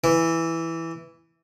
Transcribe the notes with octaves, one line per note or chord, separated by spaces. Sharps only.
E3